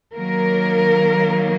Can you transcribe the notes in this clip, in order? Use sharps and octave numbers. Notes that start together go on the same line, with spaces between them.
D#3 F#3 A#3 A#4